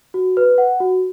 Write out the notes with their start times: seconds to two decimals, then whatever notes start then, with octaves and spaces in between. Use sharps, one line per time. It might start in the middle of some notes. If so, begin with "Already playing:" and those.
0.14 F#4
0.37 B4
0.58 F#5
0.80 F#4